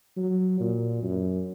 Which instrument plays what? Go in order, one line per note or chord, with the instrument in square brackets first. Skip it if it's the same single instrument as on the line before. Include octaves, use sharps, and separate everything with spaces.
[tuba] F#3
A#2
F#2